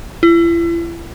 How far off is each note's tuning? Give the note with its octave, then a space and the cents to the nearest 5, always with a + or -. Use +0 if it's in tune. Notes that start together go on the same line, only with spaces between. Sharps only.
E4 +40